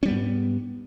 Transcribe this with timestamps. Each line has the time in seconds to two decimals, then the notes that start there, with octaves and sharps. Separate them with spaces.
0.03 C#4
0.05 G3
0.08 B3
0.11 G#2